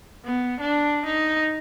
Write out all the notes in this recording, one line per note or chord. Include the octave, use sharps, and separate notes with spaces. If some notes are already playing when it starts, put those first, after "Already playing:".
B3
D4
D#4